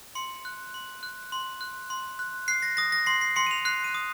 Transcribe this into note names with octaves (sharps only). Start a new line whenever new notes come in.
C6 C#7
F#6
C6
F#6
C6
F#6
C6
F#6
F#6 C7
A#6
D#6 A#6
A#6
C6 C7
C7
C6 C#7
D#7
F7
F#6 C7
D#7
D#6